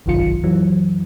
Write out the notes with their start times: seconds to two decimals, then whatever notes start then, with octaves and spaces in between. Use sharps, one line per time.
0.06 G1 C2 F#2 D#3 F4 C#7
0.44 F#2 E3 F#3